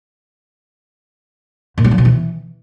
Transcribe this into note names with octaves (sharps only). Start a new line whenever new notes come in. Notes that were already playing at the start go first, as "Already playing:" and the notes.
A#2
F#3
F3
B2
E3